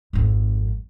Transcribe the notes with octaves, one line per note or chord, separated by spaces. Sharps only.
G#1 F2